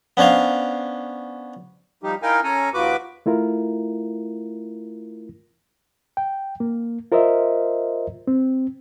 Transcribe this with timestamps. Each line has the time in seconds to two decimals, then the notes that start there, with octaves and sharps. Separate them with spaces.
0.17 B3 C#4 D4 C5 F5
2.03 F3 G3 D#4 G4
2.22 D#4 E4 A#4 F5 G5 G#5
2.44 C#4 A4 G#5 A#5
2.74 D#2 F3 F#4 B4 D6
3.26 A3 E4 F4 A#4
6.17 G5
6.60 A#3
7.12 F4 A#4 C5 D#5 E5
8.28 C4